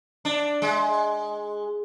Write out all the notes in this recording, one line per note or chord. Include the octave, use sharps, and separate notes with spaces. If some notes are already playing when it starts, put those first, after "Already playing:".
D4
G#3